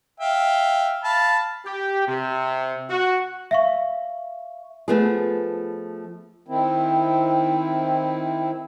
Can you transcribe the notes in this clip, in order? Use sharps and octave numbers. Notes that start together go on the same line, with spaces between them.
E5 F5 G5
F5 A5 B5
G4
C3
F#4
E5 F5 C#6
F3 A3 B3 F4 G#4
D#3 C4 E4